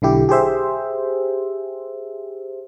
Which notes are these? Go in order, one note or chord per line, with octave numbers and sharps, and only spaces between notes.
B1 D3 E4 G4
G4 G#4 C5 E5